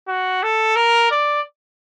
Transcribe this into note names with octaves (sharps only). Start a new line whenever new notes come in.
F#4
A4
A#4
D5